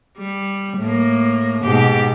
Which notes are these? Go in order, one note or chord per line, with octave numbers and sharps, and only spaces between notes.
G3
A2 A#3
G#2 B2 G4